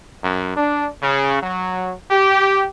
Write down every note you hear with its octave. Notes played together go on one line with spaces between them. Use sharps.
F#2
D4
C#3
F#3
G4